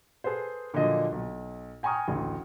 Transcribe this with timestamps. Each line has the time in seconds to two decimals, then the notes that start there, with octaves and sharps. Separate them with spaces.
0.24 G#4 A4 B4 C5
0.74 A#2 D3 F3 F#3 D#5
1.12 B1
1.83 G5 G#5 A#5 C#6 D#6 F6
2.08 A1 D2